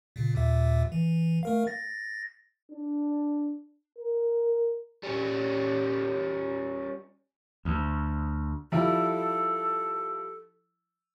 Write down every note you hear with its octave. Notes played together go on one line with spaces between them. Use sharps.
A#2 C#3
D#2 A#2 E5
E3
A3 A#4 F5
A6 A#6
D4
A#4
G3 C#4
D2
F3 G3 E4 A4